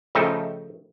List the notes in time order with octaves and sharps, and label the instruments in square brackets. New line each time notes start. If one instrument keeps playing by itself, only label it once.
[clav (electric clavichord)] C#3 F3 A3 D#4 A4 G5